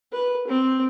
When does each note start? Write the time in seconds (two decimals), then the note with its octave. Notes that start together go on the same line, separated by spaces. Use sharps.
0.12 B4
0.47 C4